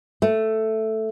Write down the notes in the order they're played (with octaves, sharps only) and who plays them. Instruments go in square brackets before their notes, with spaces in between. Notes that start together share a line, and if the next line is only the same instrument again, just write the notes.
[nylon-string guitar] A3